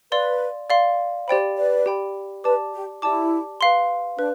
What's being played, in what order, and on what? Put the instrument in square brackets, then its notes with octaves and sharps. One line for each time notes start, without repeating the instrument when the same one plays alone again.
[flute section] B4 [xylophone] D5 F5 C6
[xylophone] D5 F5 C6
[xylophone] G4 D5 G5 B5 [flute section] C5
[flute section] B4 D5
[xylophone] G4 D5 G5 B5
[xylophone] G4 D5 A5 D6 [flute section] B4
[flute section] G4
[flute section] E4 [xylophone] G4 D5 A5 D6
[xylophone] B4 F5 C6
[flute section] D4 [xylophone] B4